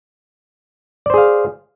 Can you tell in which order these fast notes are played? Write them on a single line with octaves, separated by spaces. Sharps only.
D5 C5 G#4 F5